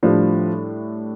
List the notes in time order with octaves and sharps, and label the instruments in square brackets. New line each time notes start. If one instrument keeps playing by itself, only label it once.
[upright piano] A2 G3 D4 [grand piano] F3